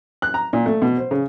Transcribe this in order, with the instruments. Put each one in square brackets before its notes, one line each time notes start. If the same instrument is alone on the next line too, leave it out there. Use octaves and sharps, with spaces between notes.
[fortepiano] F#6
A#5
A#2
A3
B2
C5
C#3